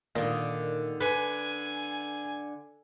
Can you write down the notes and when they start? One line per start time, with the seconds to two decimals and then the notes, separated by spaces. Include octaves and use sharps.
0.16 A#2 D3 D#3
1.01 D3 B4 G#5